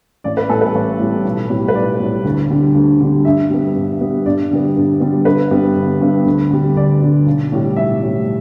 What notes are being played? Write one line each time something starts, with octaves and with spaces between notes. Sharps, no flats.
A1 D5
B4
A2 G3 A4
B4
A1
A2 G3
B1
A2 G3
B4
B1 D5
A2 G3
D2
D3 G3
D2
D3 G3
G2 E5
G3 B3
G2
G3 B3
G2 D5
D3 G3 B3
G2
D3 G3 B3
G1 B4
G2 G3 B3
G1
G2 G3 B3
D2
D3 G3
D2 D5
D3 G3
B1
A2 G3
B1 E5
A2 G3